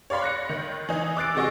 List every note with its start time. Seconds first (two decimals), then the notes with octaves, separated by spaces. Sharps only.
0.10 C#5 D5 F5 B5 C6
0.22 F#6 A#6 C#7
0.49 D#3
0.89 E3 D#4
1.17 D6 E6 F#6 A6 C7 D7
1.34 E2 C3 G#3 F#4 D#5 C#6